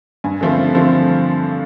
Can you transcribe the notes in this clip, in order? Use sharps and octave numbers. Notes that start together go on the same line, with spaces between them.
G2 G#5
D3 F3 A3 C4
G2
D3 F3 A3 C4